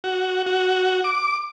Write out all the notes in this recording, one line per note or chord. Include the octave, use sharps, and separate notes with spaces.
F#4
F#4
D6